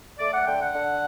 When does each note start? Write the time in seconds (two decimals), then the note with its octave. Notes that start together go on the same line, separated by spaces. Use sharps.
0.19 A3 D5
0.33 F#5
0.46 D3 G5
0.60 F#5
0.73 D3